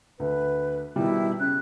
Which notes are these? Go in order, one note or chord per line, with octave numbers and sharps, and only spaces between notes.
D2 B4
B2 D#3 G3 E4
C#3 F#6